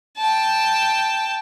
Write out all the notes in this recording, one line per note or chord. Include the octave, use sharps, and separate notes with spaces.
G5 A5